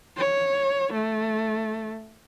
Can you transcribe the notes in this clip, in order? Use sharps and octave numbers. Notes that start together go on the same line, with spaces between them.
C#5
A3